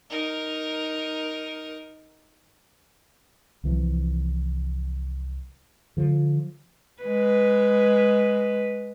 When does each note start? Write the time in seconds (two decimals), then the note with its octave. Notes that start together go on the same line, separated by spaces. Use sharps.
0.10 D#4 A#4
3.64 C2 E3 F3
5.97 D3 F3
7.03 G#3 B4